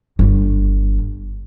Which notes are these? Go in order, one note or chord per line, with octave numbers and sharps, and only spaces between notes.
G1